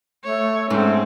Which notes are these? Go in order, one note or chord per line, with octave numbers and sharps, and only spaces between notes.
A3 C#5
G#2 A3 C4 C#4 G5